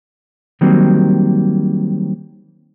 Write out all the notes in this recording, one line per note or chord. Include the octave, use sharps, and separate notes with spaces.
D#3 F#3 G3 A#3 C4